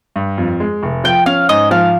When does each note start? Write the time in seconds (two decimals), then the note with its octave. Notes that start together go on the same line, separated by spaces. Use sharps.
0.16 G2
0.38 F2
0.60 G#3
0.83 F1
1.04 F3 G5
1.26 C#4 F5
1.49 G#2 D#5
1.71 F3 F5